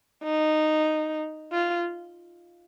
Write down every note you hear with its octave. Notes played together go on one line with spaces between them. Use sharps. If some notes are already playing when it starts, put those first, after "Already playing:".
D#4
F4